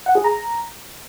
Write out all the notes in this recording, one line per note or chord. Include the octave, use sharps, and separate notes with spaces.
F#5
G#4
A#5